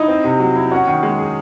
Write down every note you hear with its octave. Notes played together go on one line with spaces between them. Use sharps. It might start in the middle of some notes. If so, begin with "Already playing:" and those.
Already playing: D#4 E4 D#5
C4
C3
F#3
E4
C#4 F#4 F#5
D#3
G#3
G#4